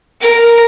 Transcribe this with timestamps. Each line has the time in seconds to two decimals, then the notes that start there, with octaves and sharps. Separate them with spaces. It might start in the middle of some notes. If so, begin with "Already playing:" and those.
0.21 A#4